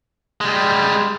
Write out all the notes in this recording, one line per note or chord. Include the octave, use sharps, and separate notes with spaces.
G3 G#3